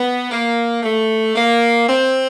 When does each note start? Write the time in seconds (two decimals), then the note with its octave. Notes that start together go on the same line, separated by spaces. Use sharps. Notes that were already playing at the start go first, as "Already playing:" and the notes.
Already playing: B3
0.31 A#3
0.83 A3
1.35 A#3
1.87 C4